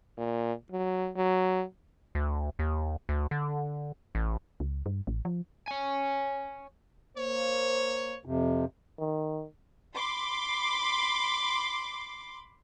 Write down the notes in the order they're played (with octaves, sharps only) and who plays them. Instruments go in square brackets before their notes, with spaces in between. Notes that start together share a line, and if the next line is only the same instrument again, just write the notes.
[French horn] A#2
F#3
F#3
[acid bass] D2
D#2
D2
D3
A1
[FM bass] C#2
G2
A1
F3
[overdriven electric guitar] C#5 G#5
[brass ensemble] A#3 C5 [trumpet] C#5
[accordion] F2 C3
[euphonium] D#3
[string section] B5 C6 D6